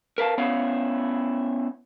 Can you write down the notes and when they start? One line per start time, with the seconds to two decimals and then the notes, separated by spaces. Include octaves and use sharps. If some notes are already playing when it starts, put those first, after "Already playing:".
0.18 A#4 B4 F5 A5
0.38 B3 C#4 E4 C#5 F5